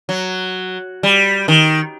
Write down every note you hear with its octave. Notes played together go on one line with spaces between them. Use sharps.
F#3
G3
D#3